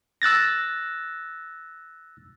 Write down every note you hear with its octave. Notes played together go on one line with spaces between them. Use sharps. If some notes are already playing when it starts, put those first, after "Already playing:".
E6 F#6 A6 A#6